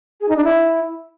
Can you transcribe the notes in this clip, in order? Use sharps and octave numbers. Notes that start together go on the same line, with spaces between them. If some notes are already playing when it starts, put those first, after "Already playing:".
G#4
D#4
D4
E4